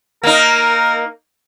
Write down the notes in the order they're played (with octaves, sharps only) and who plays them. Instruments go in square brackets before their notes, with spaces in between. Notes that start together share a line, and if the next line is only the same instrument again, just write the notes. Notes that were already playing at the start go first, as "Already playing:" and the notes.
[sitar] A#3 D#4 [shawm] A#4